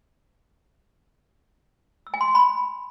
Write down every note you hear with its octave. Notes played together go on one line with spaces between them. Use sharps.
E6
G#5
C6
G#5
B5